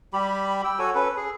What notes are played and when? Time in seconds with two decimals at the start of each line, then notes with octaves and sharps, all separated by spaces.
0.13 G3 G4 B5
0.64 G5 E6
0.79 F#4 A4 C#5 G#5
0.95 C#4 A4 B4
1.17 G#4